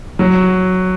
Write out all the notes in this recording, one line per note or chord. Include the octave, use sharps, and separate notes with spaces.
F#3